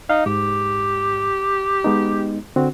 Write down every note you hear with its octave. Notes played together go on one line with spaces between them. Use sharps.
D#4 F5
G#2 G4
G#3 B3 D#4
D3 C4 F#4